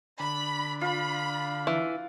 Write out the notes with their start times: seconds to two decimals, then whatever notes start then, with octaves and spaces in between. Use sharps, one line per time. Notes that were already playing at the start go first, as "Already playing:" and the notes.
0.20 D3 B5
0.81 F4 B5
1.67 E3